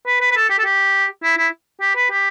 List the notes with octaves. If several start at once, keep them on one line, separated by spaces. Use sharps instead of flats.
B4
B4
B4
A4
G4
A4
G4
E4
E4
G4
B4
G4